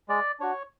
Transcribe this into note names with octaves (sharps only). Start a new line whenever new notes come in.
G#3 D5
D4 F#4 C#5